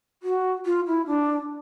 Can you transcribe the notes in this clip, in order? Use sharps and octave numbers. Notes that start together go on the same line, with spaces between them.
F#4
F4
E4
D4